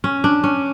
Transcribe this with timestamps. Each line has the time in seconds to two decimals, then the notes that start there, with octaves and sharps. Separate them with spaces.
0.04 C#4
0.24 D4
0.44 C#4